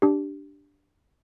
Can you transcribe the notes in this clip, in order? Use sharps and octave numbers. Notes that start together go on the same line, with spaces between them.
D4 G4